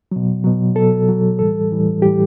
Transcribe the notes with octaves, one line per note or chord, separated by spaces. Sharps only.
B2 F#3
B2 F#3
B2 F#3 A4
B2 F#3
A2 E3 G3 A4
A2 E3 G3
A2 E3 G3 G4